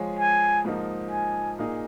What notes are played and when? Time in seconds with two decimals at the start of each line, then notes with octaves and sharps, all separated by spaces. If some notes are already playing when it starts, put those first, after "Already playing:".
Already playing: F3 G#3 F4 G#4 C#5
0.19 G#5
0.64 G#2 F3 A#3 D#4
1.11 G#5
1.59 A#2 A#3 D#4 G#4